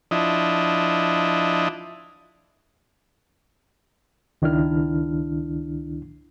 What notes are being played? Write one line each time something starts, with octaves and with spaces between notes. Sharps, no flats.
F3 D4 E4 D#5
C#2 D#3 D4 E4 F6